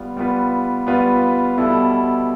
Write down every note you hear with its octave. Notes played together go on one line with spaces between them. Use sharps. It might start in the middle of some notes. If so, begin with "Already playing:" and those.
Already playing: G3 B3 F4
G3 B3 F4 B4
G3 B3 F4 B4
B2 G3 B3 E4 A4